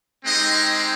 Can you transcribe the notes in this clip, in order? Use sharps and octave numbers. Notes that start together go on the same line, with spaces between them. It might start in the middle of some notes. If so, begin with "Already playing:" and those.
G#3 C4 D#4 G4 D#5